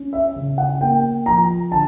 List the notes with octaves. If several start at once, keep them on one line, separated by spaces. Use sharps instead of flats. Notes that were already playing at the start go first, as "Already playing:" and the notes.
Already playing: C#4
E5
C#3
F#5
A#3 G5
F3 A#5
D3 A5